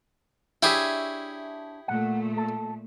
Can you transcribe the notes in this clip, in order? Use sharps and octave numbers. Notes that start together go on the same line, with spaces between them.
D4 E4 G4 G#4 C#5 E5
A#2 A3 F#5
A4